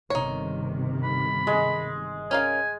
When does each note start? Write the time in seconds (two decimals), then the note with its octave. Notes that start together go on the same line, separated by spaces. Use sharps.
0.10 G1 C3 D#3 D#4 C#5
1.03 B5
1.47 G#3
2.31 C#4 A#4 F5 G#5